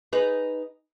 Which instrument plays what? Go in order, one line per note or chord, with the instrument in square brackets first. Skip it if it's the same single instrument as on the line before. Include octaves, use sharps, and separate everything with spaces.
[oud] D#4 G#4 B4